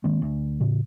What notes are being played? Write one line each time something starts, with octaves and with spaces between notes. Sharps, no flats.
D#3 G#3 A#3 C4
D2
A2 C#3